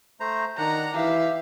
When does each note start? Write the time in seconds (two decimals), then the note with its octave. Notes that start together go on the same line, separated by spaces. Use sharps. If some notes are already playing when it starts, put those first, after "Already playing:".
0.20 A3 C5 A#5
0.58 D#3 D4 F#5 A#5 F#6
0.95 E3 G4 E5 F5